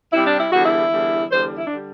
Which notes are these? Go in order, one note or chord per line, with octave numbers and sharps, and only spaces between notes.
C3 G3 C4 E4
D4
E4
E2 D3 G3 F#4
E4
E2 D3 G3
E2 D3 G3 C5
E4
D4
D3 G3